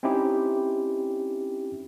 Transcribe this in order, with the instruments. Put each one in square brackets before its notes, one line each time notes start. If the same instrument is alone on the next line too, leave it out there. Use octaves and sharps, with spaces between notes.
[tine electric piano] C4 C#4 D#4 E4 G4